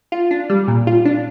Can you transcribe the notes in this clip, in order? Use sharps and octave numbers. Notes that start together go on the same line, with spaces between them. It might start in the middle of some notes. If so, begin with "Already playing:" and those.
F4
D4
G3
A#2
F4
D4